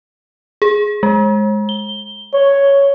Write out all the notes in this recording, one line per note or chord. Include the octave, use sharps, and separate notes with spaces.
G#4
G#3
G7
C#5